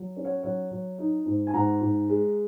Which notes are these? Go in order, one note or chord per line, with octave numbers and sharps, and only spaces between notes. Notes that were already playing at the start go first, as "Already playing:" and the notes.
Already playing: F#3
C#4
C#5 F#5
F#3 C#5 F#5
F#3
D#4
G#2
G#5
G#2 F#5 A#5
G#2
G#3